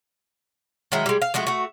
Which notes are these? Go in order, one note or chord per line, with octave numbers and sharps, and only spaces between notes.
D#3 F#3 G#3 E4
G3 G#3
F5
F3 G#3 A3 F#4
A3 F#4